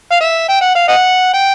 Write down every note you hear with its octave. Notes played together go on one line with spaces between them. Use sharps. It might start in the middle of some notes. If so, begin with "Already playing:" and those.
F5
E5
G5
F#5
F5
D#5 F#5
G5